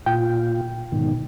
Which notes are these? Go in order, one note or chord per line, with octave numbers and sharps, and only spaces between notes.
A#2 F4 G5
G#2 B2 D#3